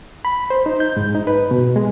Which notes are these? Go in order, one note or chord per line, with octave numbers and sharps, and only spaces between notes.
B5
C5
D#4
G6
G#2
D#4
B4
B2
G#3